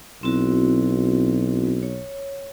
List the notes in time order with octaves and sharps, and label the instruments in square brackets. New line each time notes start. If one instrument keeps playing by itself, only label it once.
[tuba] B1 [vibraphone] C4 E4 F#4
[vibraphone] C#5